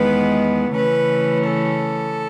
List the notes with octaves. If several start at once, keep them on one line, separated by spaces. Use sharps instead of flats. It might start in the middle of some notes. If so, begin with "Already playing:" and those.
Already playing: E2 D#3 G#3 B3 B4
C#3 E3 A3 C#4 B4
A4